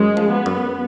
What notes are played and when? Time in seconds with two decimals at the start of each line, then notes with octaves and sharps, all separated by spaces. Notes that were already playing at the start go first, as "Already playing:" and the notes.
Already playing: F#2 G#3
0.17 F3
0.31 B3
0.46 F#2